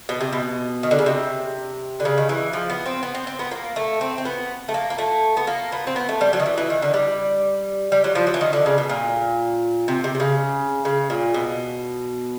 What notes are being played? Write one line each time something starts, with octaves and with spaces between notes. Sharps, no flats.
B2
C3
B2
D#3
D3
C#3
C3
D3
C#3
D#3
E3
F3
B3
C4
B3
C4
C4
B3
A#3
A3
C4
C4
B3
A3
A#3
A#3
A3
B3
A#3
B3
C4
B3
A3
G3
F#3
D#3
E3
E3
D#3
D3
G3
G3
F#3
F3
F#3
E3
D#3
D3
C#3
B2
A#2
C3
C3
C3
C#3
C#3
A#2
B2